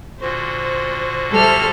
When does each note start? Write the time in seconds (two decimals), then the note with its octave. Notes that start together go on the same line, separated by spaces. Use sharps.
0.21 A#2 D3 F#4 C5
1.32 G3 A4 C5 E5 F6